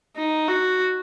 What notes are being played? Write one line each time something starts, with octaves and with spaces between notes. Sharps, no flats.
D#4
F#4